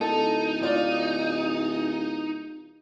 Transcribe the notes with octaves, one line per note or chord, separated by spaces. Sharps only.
D1 D#4 A4
D#4 F4 D5